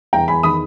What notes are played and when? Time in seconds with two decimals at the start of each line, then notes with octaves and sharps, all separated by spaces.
0.13 E2 G5 A#5
0.28 E2 G#5 B5
0.43 D#3 B5 D#6